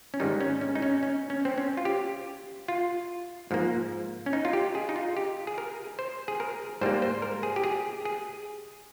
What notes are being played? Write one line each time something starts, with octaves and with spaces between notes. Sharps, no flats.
C#4
G#2 D#3 G3 D#4
C#4
C#4
D#4
C#4
C#4
C#4
C4
C#4
F4
G4
F4
G#2 F3 A#3
C#4
D#4
F4
G4
G#4
D#4
F4
G4
G#4
A#4
C5
G#4
A#4
G#2 G3 A#3 C5
C5
A#4
G#4
G4
G#4
G#4